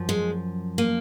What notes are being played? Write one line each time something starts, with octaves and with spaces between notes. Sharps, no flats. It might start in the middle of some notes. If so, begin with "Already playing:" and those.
Already playing: F#2 F3
G#3
A#3